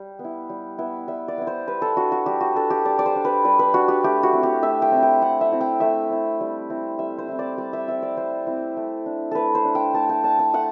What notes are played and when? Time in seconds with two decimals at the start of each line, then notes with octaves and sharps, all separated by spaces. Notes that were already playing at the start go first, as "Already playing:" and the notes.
Already playing: G3
0.19 B3
0.24 E4
0.50 G3
0.78 B3 E4
1.08 G3 E5
1.28 D5
1.38 B3 E4
1.47 C5
1.67 G3 B4
1.82 A4
1.97 D4 F#4
2.12 F#4
2.26 G3 G4
2.41 F#4
2.55 D4 A4
2.70 G4
2.85 G3 D5
2.99 D5
3.06 C5
3.16 D4
3.25 B4
3.45 G3 B4
3.59 B4
3.74 D4 F#4
3.88 G4
4.04 A3 G4
4.23 F#4
4.33 C4 E4
4.43 G4
4.62 A3 E5
4.82 G5
4.92 C4 E4
5.03 G5
5.22 A3 F#5
5.41 E5
5.52 C4 E4
5.61 G5
5.80 A3 E5
6.10 C4 E4
6.41 G3
6.70 C4 E4
6.99 G3 E5
7.18 C5
7.28 C4 E4
7.39 D5
7.57 G3 D5
7.73 E5
7.88 C4 E4 E5
8.03 D5
8.17 G3 C5
8.47 C4 E4
8.77 A3
9.06 D4
9.31 A3 A4 B4
9.55 C5
9.65 D4
9.75 G5
9.94 A3 A5
10.09 G5
10.24 D4 A5
10.39 G5
10.54 A3 F#5